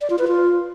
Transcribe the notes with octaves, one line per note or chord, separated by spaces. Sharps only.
D5
F4
B4
F4